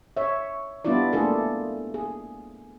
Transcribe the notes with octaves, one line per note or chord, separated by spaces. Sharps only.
C#5 E5
G3 B3 D4 E4 F4 D5
A3 A#3 D4 F4 G#4 A4
G#4